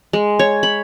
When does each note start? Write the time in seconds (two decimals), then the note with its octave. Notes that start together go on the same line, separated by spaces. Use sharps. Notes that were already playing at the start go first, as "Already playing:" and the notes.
0.13 G#3
0.39 C#5
0.63 B5